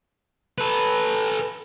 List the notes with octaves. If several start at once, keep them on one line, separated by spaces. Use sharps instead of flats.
A4 B4